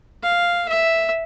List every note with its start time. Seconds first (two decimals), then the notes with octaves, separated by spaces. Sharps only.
0.23 F5
0.68 E5